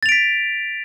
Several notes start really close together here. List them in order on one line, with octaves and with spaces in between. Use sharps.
A6 F7 D7 B6